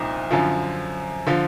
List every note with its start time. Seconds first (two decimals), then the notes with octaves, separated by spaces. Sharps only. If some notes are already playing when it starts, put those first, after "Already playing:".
Already playing: C2 A#2 F3 D#4
0.31 F#2 D3 F3
1.27 D3 F3